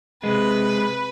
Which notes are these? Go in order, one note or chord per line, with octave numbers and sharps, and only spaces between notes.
C3 G#3 B4